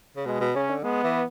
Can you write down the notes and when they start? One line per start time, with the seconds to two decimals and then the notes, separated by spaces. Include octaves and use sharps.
0.16 C#3
0.26 B2 G#3
0.40 B2
0.55 C#3 C#4
0.70 D3
0.83 G#3 B3
1.04 E3